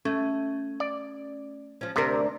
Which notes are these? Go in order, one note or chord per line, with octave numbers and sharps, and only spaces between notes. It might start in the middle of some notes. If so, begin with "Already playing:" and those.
A3 C#4
D5
F3 C#4
D2 C3 D4 A#4